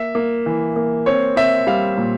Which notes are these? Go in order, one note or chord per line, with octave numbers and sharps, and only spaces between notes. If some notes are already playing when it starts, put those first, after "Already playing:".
Already playing: A#3 E5
A#3
E3
A#3
C4 C#5
C4 E5
G3 F5
A#2